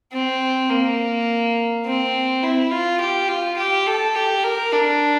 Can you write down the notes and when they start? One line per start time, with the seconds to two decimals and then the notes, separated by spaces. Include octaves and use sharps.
0.12 C4
0.70 A#3
1.86 C4
2.43 E4
2.71 F4
3.00 G4
3.29 F4
3.58 G4
3.87 A4
4.15 G4
4.44 A#4
4.73 D4